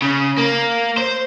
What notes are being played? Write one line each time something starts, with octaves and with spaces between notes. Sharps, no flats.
C#3
A#3
C5